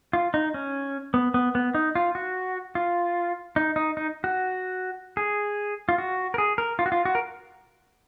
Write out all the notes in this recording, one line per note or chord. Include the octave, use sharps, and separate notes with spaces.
F4
D#4
C#4
B3
B3
B3
D#4
F4
F#4
F4
D#4
D#4
D#4
F#4
G#4
F4
F#4
A#4
G#4
A#4
F4
F#4
F4
F#4
A#4